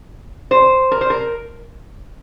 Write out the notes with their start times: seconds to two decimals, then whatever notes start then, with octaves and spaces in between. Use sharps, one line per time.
0.51 C5
0.91 A#4
1.01 C5
1.10 A#4